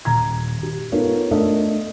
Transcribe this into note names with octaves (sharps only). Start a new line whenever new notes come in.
D#1 A#5 G#6
G4
B3 D#4 F4 A4 A#4 C#5
A3 D4 A4 A#4 D#5